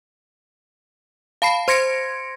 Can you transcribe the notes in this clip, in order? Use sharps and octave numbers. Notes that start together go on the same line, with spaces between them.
F5 A5 B5 C7
C5 C6 G#6 A#6 C#7 D7